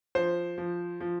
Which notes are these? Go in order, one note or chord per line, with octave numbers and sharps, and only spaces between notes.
F3 C5
F3
F3